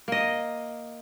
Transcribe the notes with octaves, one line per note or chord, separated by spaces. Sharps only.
A#3 D#5